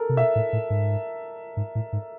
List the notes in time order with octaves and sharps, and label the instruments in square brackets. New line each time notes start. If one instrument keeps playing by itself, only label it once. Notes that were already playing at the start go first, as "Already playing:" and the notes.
Already playing: [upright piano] A4 A#4
[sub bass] C3
[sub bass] B2 [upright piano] E5
[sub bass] A2
A2
G#2
G#2
A2
G#2